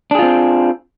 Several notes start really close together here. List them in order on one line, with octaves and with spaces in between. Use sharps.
D4 G#4 F4 C4